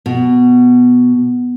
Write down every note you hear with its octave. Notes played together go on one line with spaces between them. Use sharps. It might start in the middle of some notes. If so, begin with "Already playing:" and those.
B2